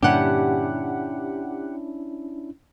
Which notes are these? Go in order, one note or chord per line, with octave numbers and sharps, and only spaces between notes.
G2 A#2 D3 C#4 D4 E4 G4 F#5